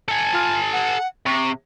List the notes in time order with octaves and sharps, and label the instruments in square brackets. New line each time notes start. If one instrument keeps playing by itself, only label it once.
[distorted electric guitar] A4 G#5
[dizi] F4
F#5
[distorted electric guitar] C3 [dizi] C#6